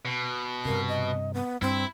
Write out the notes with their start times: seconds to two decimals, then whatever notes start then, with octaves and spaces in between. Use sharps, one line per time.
0.05 B2
0.65 G2 C3 A#4
0.88 D#5
1.34 B3
1.62 G2 C4 E4